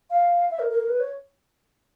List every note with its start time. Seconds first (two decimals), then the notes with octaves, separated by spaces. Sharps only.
0.10 F5
0.51 E5
0.59 A#4
0.70 A#4
0.80 A#4
0.89 B4
1.00 C#5